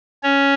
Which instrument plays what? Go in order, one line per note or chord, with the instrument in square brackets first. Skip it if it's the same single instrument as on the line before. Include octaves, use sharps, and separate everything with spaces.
[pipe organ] C#4 C#5